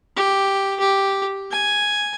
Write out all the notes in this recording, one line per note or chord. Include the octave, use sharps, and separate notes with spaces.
G4
G4
G#5